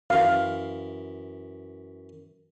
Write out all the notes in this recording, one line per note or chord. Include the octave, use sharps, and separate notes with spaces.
F#2 E3 F5